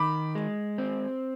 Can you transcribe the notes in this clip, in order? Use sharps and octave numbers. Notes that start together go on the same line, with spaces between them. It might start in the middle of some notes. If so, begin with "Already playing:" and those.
Already playing: D#3 B5 D6
G#3
C4